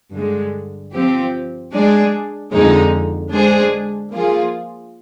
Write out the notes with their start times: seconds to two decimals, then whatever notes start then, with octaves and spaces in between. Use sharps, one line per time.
0.13 G2 D3 G#3
0.93 F3 C4 G4
1.73 G#3 D4 G#4 D5
2.53 F2 D3 G#3 D#4
3.33 G#3 D4 G#4 C5
4.13 F3 A#3 F4 G#4